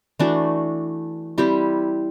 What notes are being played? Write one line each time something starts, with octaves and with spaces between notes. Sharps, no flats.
E3 A3 D4 F#4
G3 C4 E4 G4